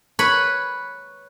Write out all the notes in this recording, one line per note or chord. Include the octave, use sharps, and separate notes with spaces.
B4 C#5 B5